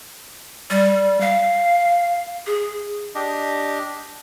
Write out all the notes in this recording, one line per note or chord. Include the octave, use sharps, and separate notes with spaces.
G3
F5
G#4
D4 G4 D#5